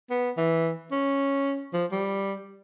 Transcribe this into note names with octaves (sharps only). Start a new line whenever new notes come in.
B3
E3
C#4
F3
G3